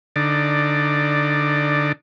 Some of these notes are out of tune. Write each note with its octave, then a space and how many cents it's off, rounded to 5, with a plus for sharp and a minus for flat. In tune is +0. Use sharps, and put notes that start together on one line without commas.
D3 +0 D#4 -15 D5 +5